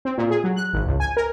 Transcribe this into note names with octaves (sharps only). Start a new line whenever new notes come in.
C4
A#2
G#4
F#3
F#6
G#1
C#2
G#5
A#4